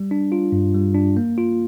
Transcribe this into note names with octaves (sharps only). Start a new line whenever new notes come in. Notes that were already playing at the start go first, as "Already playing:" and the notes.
Already playing: G3
D4
F4
G2
G3
D4
A#3
F4